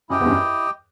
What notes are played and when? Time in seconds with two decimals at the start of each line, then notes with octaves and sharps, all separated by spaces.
0.09 F#2 E4 G4 D#5 G5
0.20 E2
0.25 G2
0.29 F#2